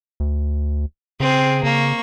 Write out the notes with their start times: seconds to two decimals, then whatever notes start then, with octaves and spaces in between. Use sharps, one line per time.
0.20 D2
1.20 C#3 C4 G#4
1.63 C#3 A#3 C#6